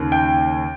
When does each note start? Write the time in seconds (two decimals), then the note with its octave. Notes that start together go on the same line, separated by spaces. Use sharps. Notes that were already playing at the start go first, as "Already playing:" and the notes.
Already playing: D#2 C#3
0.12 G5